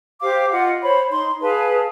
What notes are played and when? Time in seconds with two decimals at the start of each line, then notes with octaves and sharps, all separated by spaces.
0.22 G4 C5 F5 D6
0.51 F4 D#5 F5 F#5
0.82 C5 C#5 B5
1.11 D#4 C6
1.41 G#4 B4 F5 A5